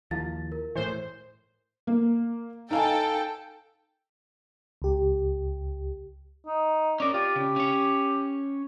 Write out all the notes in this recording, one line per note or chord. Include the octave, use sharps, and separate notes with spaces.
D#2 F3 E4 F5 A6
A#4
A2 E3 C5
A#3
D#4 A4 F5 G5 G#5
C#2 G4
D#4
C#4 A#4 D5
F4 G4
C#3
C#4 C#5